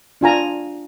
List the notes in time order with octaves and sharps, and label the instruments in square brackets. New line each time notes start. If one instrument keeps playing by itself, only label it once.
[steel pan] D4 F4 G#5 A#5